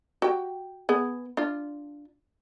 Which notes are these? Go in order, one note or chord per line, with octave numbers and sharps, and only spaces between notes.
F#4 G4 G5
B3 G#4
D4 F4